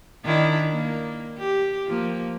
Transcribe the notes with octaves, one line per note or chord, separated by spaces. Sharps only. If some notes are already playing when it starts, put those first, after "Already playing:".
D#3 D4 E4
A#3
G4
F3 A#3